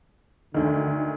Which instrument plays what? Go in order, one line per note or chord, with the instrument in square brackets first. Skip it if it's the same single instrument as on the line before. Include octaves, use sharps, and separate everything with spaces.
[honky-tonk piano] D2 D#3 [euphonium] D3